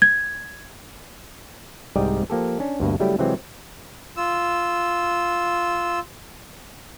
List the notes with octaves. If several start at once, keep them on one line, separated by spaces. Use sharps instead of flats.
G#6
C2 G#2 G3 D5 D#5 G5
F3 A#3 G4 A4
C#4 D4
D2 G2 B2 A#3
C#3 F#3 G3 A3 E4 G4
C3 E3 F#3 G#3 C4
F4 E6